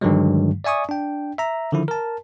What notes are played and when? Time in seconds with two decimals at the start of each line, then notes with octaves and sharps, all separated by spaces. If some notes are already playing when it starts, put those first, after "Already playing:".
0.01 G2 D3 D#3 F3 F#3 G#3
0.64 D5 E5 G#5 C#6 D#6
0.89 D4 G5
1.38 E5 A#5
1.72 D3 D#3 F3 E4
1.88 A#4 A5